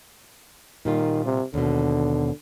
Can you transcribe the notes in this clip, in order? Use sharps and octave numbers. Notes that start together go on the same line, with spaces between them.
A#2 D#3 G3 F4
C3
D#2 B2 D3